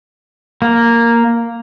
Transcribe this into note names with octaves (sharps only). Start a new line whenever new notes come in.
A#3